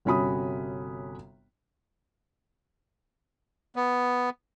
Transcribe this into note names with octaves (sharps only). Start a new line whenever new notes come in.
G1 C3 C#4 F#4 B5 D#6
B3